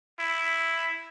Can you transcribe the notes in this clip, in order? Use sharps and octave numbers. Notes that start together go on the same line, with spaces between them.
E4